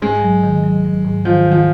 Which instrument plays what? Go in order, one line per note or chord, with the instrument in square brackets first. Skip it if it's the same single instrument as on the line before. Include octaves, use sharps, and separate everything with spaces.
[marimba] G#2 [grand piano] G#3
[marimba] F#3
D#3
F#3
F#3
G#2
[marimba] D#3 [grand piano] F3
[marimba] D#3 [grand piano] F3